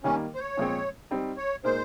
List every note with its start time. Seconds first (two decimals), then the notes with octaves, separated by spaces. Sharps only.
0.03 D#3 G3 A#3 C#4
0.35 C5
0.39 C#5
0.57 A#2 F3 G#3 C4
1.11 G3 C4 D#4
1.37 C#5
1.64 A#2 G#3 D#4 A#4 C5